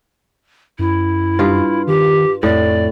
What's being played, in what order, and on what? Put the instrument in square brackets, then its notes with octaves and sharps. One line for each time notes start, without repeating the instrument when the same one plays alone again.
[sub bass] F#2 [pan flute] E4
[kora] G2 F4
[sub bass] D#3 [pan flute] G4
[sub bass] F2 [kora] A2 [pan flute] D5